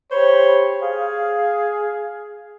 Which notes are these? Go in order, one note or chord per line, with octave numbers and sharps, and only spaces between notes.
G4 C5 C#5 B5
G#4 F5